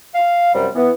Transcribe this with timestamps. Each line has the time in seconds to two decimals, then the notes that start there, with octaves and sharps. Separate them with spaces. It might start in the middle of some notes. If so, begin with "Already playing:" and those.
0.15 F5
0.53 F#2 C3 F3 G3
0.75 E3 B3